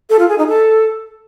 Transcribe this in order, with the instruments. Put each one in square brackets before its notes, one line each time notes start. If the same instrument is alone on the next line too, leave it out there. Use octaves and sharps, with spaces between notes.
[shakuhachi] A4
F4
G#4
D#4
A4